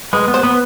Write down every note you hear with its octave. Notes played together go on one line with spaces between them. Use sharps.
G#3 B4
B3
C5
B3